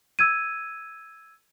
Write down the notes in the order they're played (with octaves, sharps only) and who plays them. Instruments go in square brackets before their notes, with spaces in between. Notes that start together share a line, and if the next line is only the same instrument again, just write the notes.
[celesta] E6 G#6 D#7